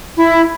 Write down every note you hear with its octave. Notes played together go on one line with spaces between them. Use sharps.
E4